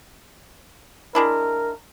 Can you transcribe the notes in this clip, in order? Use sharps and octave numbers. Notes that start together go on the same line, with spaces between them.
G#3 D4 E4 A#4